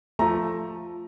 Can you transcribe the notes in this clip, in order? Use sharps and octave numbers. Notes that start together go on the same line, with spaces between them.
F3 A3 A#5